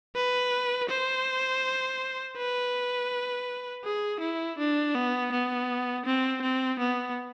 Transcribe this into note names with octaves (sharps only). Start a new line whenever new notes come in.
B4
C5
B4
G#4
E4
D4
B3
B3
C4
C4
B3